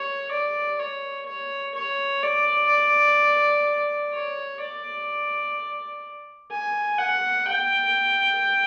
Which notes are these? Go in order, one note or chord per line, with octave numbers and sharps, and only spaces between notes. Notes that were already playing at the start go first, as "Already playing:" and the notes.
Already playing: C#5
D5
C#5
C#5
C#5
D5
C#5
D5
G#5
F#5
G5